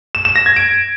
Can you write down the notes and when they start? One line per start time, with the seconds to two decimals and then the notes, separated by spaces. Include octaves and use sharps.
0.15 E7
0.25 E7
0.36 A#6
0.46 G#6
0.56 D7